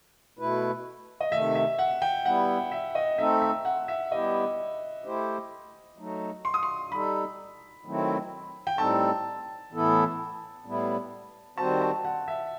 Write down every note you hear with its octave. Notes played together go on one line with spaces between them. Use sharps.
B2 A3 E4 B4
D#5
C3 D#3 A3 E5
E5
F#5
G5
G3 B3 E4 F#5
E5
D#5
A3 C4 D#4 A4 E5
E5
F#5
E5
G3 B3 E4 G4 D#5
A3 E4 G4 C5
F#3 A3 D#4
C6
D#6
C6
G3 D#4 A4 B5
D#3 F#3 A3 C4 E4
G5
A2 G3 C4 D#4 A4 A5
A2 E3 B3 E4 A4
A2 G3 B3 E4
D#3 G3 C4 F#4 C5 A5
A5
F#5
E5